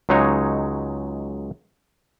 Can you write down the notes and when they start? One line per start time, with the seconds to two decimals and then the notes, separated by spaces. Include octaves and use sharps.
0.09 C#2 F#3 G#3 D#4 C#5